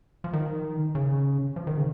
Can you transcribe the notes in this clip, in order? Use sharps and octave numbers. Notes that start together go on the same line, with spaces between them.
F3
D#3
C#3
F3
D#3
C#3